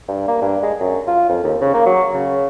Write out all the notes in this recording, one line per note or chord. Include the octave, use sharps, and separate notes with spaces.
G2
A#3
G2
G#3
F#2
F4
F2
D#2
C#3
A#3
F#3
C#3